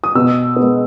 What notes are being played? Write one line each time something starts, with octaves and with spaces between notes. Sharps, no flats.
D#6
B2 E6
G#3 B3